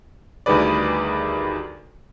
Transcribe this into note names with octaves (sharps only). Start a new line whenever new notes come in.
D2 D#3 G3 G#4 B4 D5